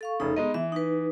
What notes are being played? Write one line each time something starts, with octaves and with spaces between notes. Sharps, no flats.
A4 F5 C#6
F1 C#3 D#4 A4
G#3 B3 D#4 D#5
E3 E5
D#4 B4